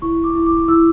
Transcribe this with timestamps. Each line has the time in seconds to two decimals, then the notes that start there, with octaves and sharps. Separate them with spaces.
0.02 E4 C#6
0.24 D6
0.35 E4
0.46 D6
0.68 E4 E6